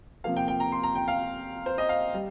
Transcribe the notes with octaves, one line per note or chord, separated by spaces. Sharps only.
C3 F3 A#3 F5
G5
G5
A#5
C6
A#5
G5
F5
C5
D#5
F5
G3